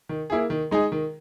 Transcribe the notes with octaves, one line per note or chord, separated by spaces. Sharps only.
D#3
A#3 E4 G#4
D#3
G#3 D#4 G#4
D#3